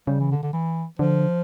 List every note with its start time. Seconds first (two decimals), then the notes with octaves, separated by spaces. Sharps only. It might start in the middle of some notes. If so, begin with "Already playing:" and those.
0.07 C#3 G3
0.20 E3
0.31 D3
0.43 D3
0.53 E3
0.99 D3 F3